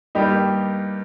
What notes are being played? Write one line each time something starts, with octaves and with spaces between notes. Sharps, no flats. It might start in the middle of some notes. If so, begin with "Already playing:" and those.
G2 G3 A#3 D#4 G4